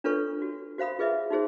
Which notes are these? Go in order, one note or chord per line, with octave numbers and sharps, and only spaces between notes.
D4 F4 A4 B4 C#5 C#6
F#4
F#4 C5 F5 B5 D#6
F4 G#4 B4 D#5 E5 D#6
D#4 F#4 G#4 C5